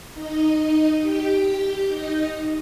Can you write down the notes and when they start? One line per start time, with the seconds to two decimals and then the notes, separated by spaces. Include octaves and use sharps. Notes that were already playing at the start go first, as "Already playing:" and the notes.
0.13 D#4 D#5
1.00 G4 G5
1.44 G4 G5
1.88 D#4 D#5